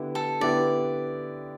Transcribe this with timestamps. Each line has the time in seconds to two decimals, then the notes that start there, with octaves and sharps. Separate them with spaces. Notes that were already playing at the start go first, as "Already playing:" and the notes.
Already playing: D3 B3 E4 G4
0.15 A4
0.41 D3 B3 E4 G4 D5